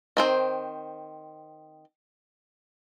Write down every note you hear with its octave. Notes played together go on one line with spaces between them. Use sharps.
D#3 C4 C5